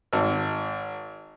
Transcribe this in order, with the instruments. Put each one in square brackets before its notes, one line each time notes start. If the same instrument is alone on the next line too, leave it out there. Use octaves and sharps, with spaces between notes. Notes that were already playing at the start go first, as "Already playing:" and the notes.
[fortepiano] G#1